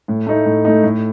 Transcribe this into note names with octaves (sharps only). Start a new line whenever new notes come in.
A2
A3 D#4
A2
A3 D#4
A2